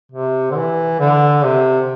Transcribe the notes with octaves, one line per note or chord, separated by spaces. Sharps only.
C3
D3
E3
D3
C3